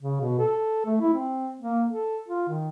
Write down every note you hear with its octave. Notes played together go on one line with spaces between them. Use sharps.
C#3
B2
A4
A3
E4
C4
A#3
A4
F4
D#3